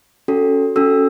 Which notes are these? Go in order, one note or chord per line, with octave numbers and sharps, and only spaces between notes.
C#4 F#4 A4
C#4 F#4 A4 E6